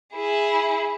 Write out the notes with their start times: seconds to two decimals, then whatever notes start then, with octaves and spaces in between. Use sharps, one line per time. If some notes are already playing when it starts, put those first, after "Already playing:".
0.15 E4 G#4